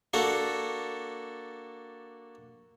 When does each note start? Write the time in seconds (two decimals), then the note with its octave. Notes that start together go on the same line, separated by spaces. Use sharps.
0.13 A#3 D4 F#4 A4